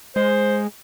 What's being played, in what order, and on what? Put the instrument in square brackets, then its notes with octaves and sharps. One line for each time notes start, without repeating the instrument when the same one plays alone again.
[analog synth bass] G#3 [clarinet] C5